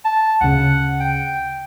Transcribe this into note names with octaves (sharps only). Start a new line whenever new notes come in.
A5
D2 C#3 F#5
G5